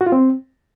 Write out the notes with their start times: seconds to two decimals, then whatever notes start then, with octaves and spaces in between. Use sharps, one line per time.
0.01 F#4
0.07 F4
0.12 C4